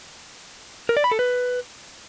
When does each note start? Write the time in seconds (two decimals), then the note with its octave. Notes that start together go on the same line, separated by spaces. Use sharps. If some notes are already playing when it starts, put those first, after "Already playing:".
0.89 A#4
0.97 D5
1.04 B5
1.12 A4
1.19 B4